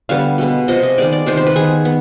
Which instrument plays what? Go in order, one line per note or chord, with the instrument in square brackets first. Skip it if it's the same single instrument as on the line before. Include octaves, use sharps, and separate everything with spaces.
[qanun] D3 G3 B3 F5
B2 G#3 B3
C3 F3 G#3 D#5
D#5
D#3 G#3 B3 D5
D5
C3 D#3 B3 C5
C5
B4
D#3 B3 G#4
B3